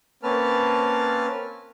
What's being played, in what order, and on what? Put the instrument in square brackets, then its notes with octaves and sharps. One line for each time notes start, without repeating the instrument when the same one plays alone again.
[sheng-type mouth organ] A#3 C4 C#4 B4 A5 F6